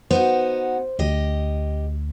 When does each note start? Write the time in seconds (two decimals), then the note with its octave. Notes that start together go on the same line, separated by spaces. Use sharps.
0.11 B3 D#4 F#4 C5
0.99 D2 G4 D#5